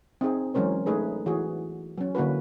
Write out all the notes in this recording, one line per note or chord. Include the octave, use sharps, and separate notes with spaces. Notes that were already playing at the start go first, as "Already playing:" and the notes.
C4 D#4 G#4
E3 F#3 G#3 C#4 A#4 C5
A3 D#4 G#4 B4
E3 F#4 G#4
F#3 C#4
D3 A#3 E4 F#4 B4